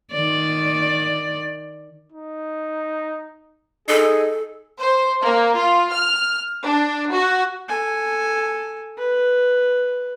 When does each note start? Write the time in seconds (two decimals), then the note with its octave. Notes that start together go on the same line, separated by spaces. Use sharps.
0.12 D#3 D5
2.12 D#4
3.88 D#4 G#4 A4
4.80 C5
5.22 A#3
5.58 F4
5.93 F6
6.64 D4
7.12 F#4
7.69 A4 G#5
8.98 B4